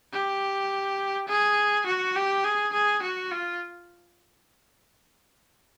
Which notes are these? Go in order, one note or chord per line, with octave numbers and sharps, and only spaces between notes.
G4
G#4
F#4
G4
G#4
G#4
F#4
F4